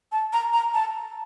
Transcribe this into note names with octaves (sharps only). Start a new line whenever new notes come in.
A5
A#5
A#5
A5